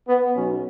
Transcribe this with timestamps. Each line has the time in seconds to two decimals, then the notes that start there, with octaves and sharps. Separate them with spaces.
0.08 B3
0.36 B1 B2 F#3 C#4